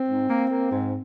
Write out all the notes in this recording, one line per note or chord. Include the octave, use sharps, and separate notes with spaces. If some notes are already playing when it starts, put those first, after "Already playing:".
Already playing: C4
G#2
A#3
A#3
G#2